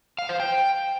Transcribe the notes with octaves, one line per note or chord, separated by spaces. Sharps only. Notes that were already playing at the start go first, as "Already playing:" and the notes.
F5
C5
G5